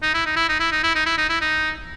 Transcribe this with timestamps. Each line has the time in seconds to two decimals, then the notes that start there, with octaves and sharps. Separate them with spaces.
0.03 D#4
0.14 E4
0.26 D#4
0.36 E4
0.49 D#4
0.60 E4
0.72 D#4
0.83 E4
0.95 D#4
1.06 E4
1.18 D#4
1.30 E4
1.41 D#4